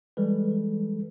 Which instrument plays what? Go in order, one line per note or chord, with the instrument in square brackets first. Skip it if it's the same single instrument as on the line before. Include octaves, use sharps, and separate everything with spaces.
[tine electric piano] E3 G3 G#3 A4 B4